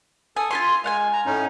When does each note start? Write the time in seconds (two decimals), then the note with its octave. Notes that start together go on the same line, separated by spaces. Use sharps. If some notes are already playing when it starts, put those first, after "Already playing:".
0.37 A4 G#5 D#6
0.51 F4 G4 G#5 C6
0.84 G#3 F5 F#5 G#5
1.13 A#5
1.26 A2 C#4 D#4